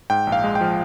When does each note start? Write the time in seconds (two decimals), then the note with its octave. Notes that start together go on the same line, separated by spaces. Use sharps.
0.10 G#2 G5
0.27 A#1
0.32 F5
0.44 G#3
0.55 G5
0.61 F3